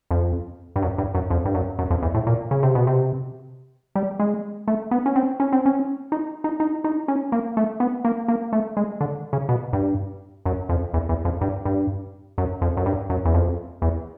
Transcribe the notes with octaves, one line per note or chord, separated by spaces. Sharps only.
F2
G2
F#2
G2
F#2
F2
G2
F#2
F#2
F2
E2
A2
A#2
C#3
C3
B2
C3
G3
G#3
A3
B3
C#4
C4
C#4
C4
C#4
D#4
D#4
D#4
D#4
C#4
A#3
A3
B3
A#3
A#3
A3
G#3
D3
C#3
B2
G2
F#2
F2
E2
E2
F2
G2
G2
F#2
F2
F#2
G2
F#2
E2
F2
E2